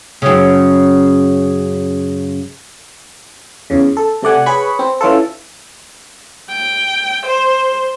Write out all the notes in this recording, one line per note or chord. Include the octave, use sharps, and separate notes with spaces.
F#2 C#3
E2 C#3
A4
C3 A3 D5 F#5 G#5
G#4 B4 C#5 B5 C#6
C4
E3 C#4 F4 A4
G5
C5